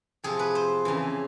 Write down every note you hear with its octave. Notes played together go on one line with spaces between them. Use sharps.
F2 C3 F3 G#4
B4
C5
F2 C#3 E3